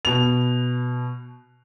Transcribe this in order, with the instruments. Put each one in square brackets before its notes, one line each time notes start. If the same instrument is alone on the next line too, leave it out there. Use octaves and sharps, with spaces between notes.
[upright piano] B2 F7